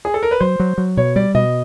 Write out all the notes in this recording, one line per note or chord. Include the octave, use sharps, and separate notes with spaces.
G#4
A4
A#4
B4
F#3 C5
F#3
F#3
B2 C#5
G3 D5
B2 D#5